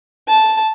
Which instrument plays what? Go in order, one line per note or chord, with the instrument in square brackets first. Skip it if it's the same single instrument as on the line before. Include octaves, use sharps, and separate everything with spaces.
[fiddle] A5